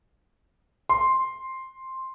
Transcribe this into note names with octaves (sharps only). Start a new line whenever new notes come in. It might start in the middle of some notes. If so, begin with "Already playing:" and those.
C6